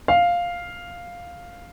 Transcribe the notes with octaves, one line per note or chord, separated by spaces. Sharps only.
F5